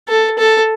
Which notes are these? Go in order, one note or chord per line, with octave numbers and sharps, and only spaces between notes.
A4
A4